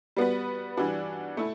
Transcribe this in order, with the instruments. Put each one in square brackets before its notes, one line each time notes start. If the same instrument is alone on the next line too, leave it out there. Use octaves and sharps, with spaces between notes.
[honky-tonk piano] G3 B3 F#4 B4
E3 G3 D4 F#4
A3 E4